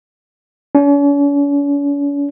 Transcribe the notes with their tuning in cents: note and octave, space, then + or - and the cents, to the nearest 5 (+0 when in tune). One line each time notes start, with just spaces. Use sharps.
C#4 +45